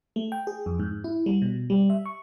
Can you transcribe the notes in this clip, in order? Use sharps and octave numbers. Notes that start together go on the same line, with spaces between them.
A3
G5
G#4
F2
G#2
E4
G3
B2
G3
E5
C#6